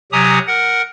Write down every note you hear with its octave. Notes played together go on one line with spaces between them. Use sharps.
C3 F#3 G4 G#5 A#5 D#6
A#4 F#5